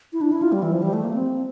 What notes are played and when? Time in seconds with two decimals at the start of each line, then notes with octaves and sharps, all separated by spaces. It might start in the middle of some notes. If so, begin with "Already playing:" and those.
0.13 E4
0.21 D4
0.32 E4
0.42 F4
0.52 G3
0.62 E3
0.73 F3
0.82 G3
0.93 A3
1.04 A#3
1.14 C4